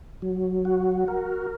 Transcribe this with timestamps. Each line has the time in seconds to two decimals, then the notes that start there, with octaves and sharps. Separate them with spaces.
0.22 F#3
0.65 F#4
1.08 A#4